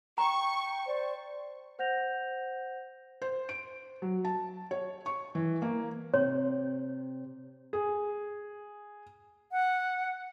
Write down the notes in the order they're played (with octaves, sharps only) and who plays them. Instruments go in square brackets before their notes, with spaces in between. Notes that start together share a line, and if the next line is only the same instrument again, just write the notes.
[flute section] G5 [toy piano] A#5 [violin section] C#6
[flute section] C5 D5
[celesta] C5 F#5 G6 A#6 F7
[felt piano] C5
D7
F#3
A5
C#5
C#6
E3
A#3
[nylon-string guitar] C3 [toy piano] C#5
[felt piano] G#4
[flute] F#5